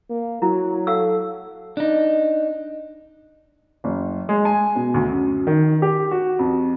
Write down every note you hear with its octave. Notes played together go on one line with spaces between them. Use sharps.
A#3
F#3 E4 F#4
A4 F5 F#5 E6
D4 D#4
F#1
G#3
G#5
B2
D2
F#2
D#3
G4
F#4
F2